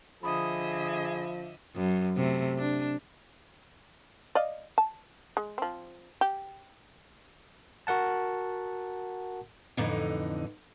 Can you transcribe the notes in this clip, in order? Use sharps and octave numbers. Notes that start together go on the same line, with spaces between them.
D3 F3 G#4 D#5 E5 B5 D#6
F#2
C3 A3
D4
D5 D#5 F5
A5
G#3
F3 C4
G4
F#4 A#4 F#5 A5
F2 A2 D3 E3 D#4